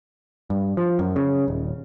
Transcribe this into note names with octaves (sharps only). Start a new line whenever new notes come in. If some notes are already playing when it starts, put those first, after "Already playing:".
G2
F3
F#2
C#3
D#1